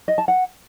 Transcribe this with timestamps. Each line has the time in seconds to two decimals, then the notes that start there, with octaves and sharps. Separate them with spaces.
0.08 D#5
0.18 A5
0.28 F#5